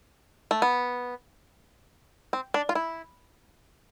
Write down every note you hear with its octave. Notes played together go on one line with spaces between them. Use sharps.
A3
B3
C4
D4
F4
E4